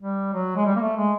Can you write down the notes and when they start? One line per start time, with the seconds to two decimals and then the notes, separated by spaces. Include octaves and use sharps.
0.01 G3
0.33 F#3
0.57 G#3
0.66 G3
0.76 A#3
0.81 A3
0.97 G#3